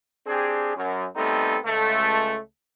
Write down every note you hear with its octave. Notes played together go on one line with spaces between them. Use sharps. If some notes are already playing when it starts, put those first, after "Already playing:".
C4 D4 G4 G#4
F#2
G3 A3 B3 C4 D#4 A4
C#2 A3